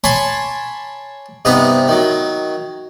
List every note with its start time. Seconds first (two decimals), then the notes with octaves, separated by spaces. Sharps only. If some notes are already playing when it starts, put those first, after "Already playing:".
0.04 C#5 G#5 A5 B5 C6 D6
1.45 G2 C3 B3 D#4 A#5
1.88 D#3 F#3